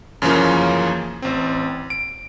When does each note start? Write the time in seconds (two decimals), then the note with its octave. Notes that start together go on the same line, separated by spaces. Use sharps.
0.22 F#2 C#3 E3 F3 A#3 C#4
1.22 A1 C4
1.90 D7